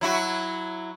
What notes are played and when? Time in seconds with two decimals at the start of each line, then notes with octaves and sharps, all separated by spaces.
0.01 F#3 E4 F#4